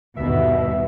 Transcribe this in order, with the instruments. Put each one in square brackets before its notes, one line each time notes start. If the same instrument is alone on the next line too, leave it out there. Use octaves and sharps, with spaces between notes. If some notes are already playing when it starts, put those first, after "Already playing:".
[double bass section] G1 D#2 [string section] B2 [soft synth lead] E5